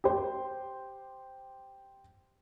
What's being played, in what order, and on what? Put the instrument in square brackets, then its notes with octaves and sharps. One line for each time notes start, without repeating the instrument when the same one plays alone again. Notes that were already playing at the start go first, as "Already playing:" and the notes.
[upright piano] G4 C5